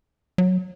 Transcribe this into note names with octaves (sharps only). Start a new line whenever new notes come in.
F#3